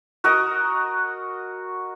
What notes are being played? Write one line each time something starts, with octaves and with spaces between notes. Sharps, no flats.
F#4 A#4 D#5